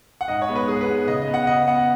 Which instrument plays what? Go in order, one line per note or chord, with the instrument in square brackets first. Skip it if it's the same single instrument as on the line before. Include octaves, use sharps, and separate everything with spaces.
[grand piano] F#5
G#2 D#5
C#5
G#3 B3
B4
G#2 G#4
B4
G#3 B3
C#3 D#5
D#5
B3
F#5
C#3 D#5
B3 F#5